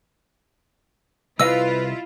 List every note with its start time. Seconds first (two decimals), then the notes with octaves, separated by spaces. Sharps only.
1.40 C2 E4 F4 B4 D#5 F5 E6